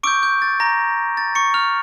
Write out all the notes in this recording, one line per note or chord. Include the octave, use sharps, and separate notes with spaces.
C#6 D6 E6 G6 D7
G6
A6
A#5 A#6
A6
C#6 C#7
F6 F7